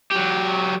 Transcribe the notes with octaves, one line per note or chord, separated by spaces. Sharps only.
F#3 G4